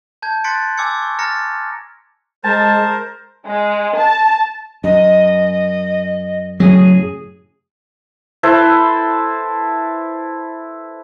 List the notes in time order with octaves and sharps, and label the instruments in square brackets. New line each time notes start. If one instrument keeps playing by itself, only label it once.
[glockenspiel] A5 G6 G#6
C6 F#6 A6 B6 C#7 D7
G#5 D6 E6 G#6 C#7
C#6
A#5 F6 A6 A#6 C#7
[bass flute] G#3 [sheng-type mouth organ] A#4 C5 [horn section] A5
[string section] G#3
A5
[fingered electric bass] F#2 [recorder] D#5
[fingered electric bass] F#2 A2 C#3 [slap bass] F#3 [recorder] G#4
[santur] E4 A4 B4 C5